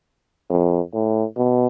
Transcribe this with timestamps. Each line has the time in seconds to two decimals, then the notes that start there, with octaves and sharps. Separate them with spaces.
0.50 F2
0.94 A2
1.37 B2